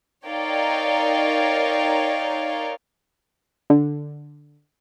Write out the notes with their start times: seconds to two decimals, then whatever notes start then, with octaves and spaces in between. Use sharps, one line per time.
0.25 D#4 A#4 C#5 D5 F5 G5
3.70 D3